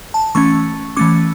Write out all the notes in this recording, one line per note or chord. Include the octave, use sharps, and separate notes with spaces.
A5
E3 A3 C#4 C#6
E3 A3 C#4 D6